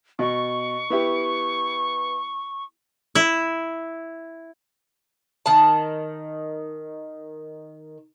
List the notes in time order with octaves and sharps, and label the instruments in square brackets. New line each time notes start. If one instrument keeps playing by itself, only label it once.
[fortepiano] B2 [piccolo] C#6
[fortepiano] B3 E4 G4
[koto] E4
[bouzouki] D#3 A5